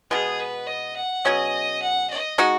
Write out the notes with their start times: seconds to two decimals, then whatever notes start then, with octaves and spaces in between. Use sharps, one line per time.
0.11 B2 G#3 B3 G#4
0.39 B4
0.67 D#5
0.96 F#5
1.25 B2 F#3 C#4 G#4 D#5
1.82 F#5
2.10 D#5
2.38 G#3 D#4 F#4